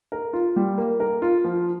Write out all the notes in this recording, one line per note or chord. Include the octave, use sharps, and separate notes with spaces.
A#4
F4
G3
A#3
A#4
F4
F3